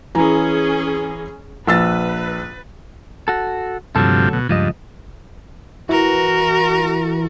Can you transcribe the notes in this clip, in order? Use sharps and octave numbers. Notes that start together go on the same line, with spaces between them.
E3 C#4 G#4 A#5
A#1 B4 E6 A6
F#4 A4
D2 G2 C3 F3 F#3 A4
B2
C#2 G2 F3 D#5
E3 F#4 A#4